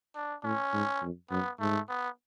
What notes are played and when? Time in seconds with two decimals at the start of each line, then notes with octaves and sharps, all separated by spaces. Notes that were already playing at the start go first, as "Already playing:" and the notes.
0.16 D4
0.44 A2 C#4
0.73 G#2
1.02 F2
1.31 F#2 B3
1.60 G#2 A3
1.89 B3